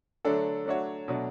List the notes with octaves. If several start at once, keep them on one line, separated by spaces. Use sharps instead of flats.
D3 F#3 A3 D4 A4
F#3 A3 D4 F#4 C#5
B2 F#3 A3 D4